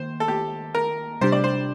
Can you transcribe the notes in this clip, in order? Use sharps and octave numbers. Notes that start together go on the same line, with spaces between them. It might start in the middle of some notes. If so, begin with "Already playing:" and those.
Already playing: D#3 A#3 C5
A4
G4
A#4
C3 G3 D4 G4 C5
D5
C5